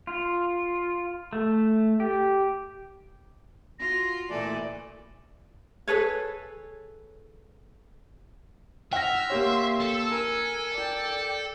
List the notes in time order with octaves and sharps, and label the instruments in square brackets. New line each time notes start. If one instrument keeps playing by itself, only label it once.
[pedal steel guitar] F4
A3
G4
[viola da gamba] F4 F#4 [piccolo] A#6
[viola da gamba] A#2 A4 B4 [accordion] E3 D5 [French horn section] A3 [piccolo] G#5
[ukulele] G#4 A4 B4 C#5
[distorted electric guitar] E5 [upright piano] F#5 A#6 [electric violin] E6 F6
[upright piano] A#3 G4 C#5 [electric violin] C6 E6
[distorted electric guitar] A4 [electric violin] E6
[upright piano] A#4 [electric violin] G#5
[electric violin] D5 G5